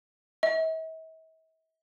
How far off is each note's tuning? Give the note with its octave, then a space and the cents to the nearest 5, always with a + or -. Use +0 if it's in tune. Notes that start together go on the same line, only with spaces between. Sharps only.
E5 -45